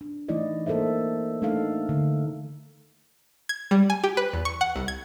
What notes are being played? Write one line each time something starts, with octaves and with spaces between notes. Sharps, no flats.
D4
E3 A3 D#4 E4 D5 D#5
A#3 A4 A#4 C5 E5
A3 D4 D#4 A4 F5
D3
G#6
G3
G#5
G4
B4
E2
C#6
F#5
C2
G#6